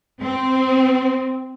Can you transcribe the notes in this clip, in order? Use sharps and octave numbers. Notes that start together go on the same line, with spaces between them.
C4